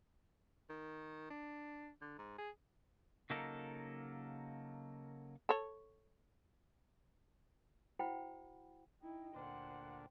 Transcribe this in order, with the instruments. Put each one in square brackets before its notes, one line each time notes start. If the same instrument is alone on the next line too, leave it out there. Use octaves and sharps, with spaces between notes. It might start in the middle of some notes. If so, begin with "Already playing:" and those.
[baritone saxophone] D#3
D4
D3
G#2
G#4
[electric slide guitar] C#3 F#3 A#3 D#4 A4 A#4
[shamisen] A4 C#5
[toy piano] E4 F#4 C5 F#5 G5 B5
[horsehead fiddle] D#4 E4 [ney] G5
[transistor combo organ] D2 A#2 D4 [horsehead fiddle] C5 F#5